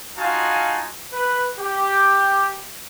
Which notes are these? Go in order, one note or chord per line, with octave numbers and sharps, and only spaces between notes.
D#4 F4 F#4 F5 G#5 A5
B4
G4